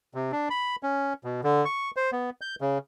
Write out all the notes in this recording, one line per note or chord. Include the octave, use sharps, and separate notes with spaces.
C3
D4
B5
C#4
B2
D3
C#6
C5
B3
G6
C#3